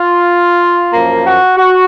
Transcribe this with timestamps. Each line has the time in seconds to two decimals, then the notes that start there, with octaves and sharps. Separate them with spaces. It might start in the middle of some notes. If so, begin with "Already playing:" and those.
Already playing: F4
0.93 F#2 F3 A#3
1.25 F#4
1.57 F#4